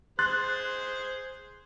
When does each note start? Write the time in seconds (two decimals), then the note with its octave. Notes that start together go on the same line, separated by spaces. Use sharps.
0.19 G#4 C5 C6 F#6 A6